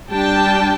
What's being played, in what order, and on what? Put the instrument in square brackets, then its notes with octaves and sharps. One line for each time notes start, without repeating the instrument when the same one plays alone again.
[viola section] G3 D4 G5 A5